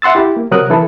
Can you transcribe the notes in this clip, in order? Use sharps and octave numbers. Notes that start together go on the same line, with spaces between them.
E5 F#5 C6 E6 A6
E4 G4
A#3
C3 F#3 A#4 D#6 F#6
E3 E4 A4